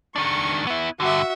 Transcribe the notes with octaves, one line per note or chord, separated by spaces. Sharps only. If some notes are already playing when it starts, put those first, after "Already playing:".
D#3 D4 C#6
B3 E4
G2 D3 F#4 E5